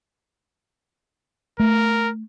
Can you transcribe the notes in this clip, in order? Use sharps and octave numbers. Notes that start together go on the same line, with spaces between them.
A3 A#4